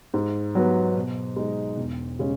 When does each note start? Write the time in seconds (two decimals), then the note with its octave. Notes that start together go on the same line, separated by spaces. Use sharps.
0.14 G#2
0.55 F#3 B3 F#4 B4
0.95 B2
1.36 G#3 D#4
1.77 E1
2.19 C#3 G#3 C#4